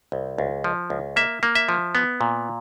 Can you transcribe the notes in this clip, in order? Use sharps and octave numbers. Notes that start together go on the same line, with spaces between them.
C2
C#2
F3
C#2
A#3 E5
A#3
E5
F3
B3
A#2